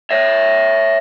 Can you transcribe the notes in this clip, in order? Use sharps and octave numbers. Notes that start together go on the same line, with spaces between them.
C#5 E5